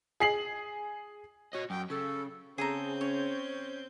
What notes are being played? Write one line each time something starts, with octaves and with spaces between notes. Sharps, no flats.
G#4 C7 F#7
F#4 C#5 D#5
F#2 G5
C#3 A4
C#3 C4 G#4 A4 A#5 G6
C#4 C#5